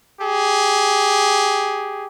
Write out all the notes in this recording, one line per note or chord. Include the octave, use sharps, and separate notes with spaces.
G4 G#4